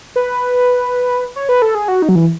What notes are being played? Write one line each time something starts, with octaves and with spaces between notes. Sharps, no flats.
B4
C#5
B4
A4
G#4
F#4
D#4
F#3
E3